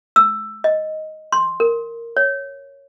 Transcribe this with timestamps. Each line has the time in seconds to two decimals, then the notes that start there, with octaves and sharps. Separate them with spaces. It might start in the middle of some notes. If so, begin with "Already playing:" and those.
0.16 E6
0.64 D#5
1.32 C6
1.60 A#4
2.17 C#5